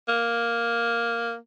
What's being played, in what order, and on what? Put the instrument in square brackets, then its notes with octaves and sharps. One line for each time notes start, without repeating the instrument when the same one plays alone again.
[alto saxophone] A#3